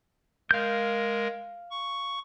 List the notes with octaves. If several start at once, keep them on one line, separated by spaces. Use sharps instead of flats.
G#3 A#4 F5 G6
C#6